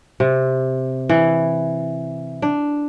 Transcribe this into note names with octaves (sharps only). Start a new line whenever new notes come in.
C3
E3
D4